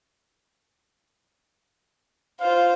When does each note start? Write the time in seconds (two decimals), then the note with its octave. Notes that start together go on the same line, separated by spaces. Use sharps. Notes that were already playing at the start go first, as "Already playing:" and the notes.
2.40 F4 C5 F5